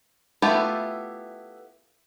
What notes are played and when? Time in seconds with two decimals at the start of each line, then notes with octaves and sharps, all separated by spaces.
0.42 A3 B3 E4 F4 G4